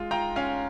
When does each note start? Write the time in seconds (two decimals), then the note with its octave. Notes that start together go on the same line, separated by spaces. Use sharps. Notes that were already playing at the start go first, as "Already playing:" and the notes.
Already playing: G#3 F4
0.11 F4 G5 A#5
0.36 C#4 F5 G#5